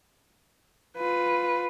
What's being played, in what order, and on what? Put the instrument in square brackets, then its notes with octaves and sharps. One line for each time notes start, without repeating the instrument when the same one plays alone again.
[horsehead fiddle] F4 B4